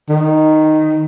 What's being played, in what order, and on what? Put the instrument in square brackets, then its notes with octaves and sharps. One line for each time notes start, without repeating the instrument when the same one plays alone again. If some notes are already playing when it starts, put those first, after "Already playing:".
[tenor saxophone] D#3